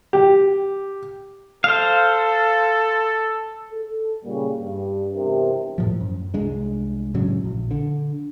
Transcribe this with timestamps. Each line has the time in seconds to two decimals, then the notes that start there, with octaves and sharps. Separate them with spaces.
0.13 G4
1.64 A4 C5 F5
3.72 A4
4.25 A#2 C#3 G3 A#3
4.60 G2
5.15 E2 G2 C3 G4 A#4
5.78 D#1 A2 F3
6.01 F#2
6.34 C2 G#3 D4
7.14 F#1 A2 C#3 F#3
7.44 A#1
7.71 D3